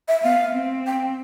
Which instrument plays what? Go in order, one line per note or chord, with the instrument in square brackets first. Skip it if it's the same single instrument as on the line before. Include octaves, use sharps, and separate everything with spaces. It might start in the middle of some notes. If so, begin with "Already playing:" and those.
[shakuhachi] E5
[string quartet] B3 [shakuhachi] F5
[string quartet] C4
[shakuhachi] G5